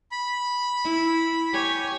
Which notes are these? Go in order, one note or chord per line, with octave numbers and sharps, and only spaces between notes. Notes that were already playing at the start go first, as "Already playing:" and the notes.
B5
E4
G4 C#5 G#5